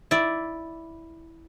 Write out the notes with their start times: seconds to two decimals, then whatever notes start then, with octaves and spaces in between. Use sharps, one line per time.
0.11 E4 D5